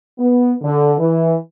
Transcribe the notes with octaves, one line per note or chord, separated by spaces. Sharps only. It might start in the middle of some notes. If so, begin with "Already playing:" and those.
B3
D3
E3